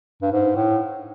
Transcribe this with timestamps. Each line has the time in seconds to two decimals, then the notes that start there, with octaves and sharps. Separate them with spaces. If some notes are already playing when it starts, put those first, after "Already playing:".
0.22 G2
0.32 G#2
0.56 A2